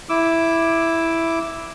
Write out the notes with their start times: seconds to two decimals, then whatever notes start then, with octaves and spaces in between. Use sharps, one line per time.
0.09 E4 D6 E6